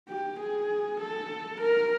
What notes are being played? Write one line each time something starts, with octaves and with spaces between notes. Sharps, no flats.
G4
G#4
A4
A#4